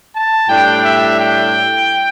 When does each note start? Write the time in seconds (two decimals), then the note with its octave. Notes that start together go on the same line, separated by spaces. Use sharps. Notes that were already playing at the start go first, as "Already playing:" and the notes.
0.14 A5
0.49 A2 G3 D4 G5
0.83 E5
1.17 G5